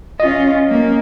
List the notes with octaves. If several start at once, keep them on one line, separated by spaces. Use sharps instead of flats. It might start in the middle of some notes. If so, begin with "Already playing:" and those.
C#4 F4 D#5
A#3 C#4